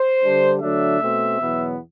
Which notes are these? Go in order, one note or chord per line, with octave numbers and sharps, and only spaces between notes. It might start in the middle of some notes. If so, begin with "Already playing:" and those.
Already playing: C5
D3 G3 D4
D3 F#3 A3 D4 E5
B2 A3 C4
E2 B2 F#3 B3